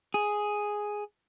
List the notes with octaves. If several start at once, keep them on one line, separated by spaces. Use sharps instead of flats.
G#4